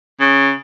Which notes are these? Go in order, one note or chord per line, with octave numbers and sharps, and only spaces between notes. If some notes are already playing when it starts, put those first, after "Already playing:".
C#3